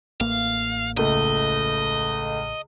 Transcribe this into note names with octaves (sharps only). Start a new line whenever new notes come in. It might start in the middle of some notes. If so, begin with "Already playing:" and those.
A1 A#3 F5
C#2 A3 D#5